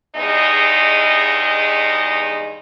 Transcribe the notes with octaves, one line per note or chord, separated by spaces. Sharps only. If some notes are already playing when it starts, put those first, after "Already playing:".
E2 G2 G#3 D#4 D#5